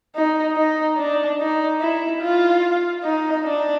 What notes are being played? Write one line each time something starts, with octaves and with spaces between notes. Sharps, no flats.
D#4
D#4
D4
D#4
E4
F4
D#4
D4